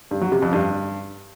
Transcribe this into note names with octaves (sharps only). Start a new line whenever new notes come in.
G2
F#3
C3
F2
G2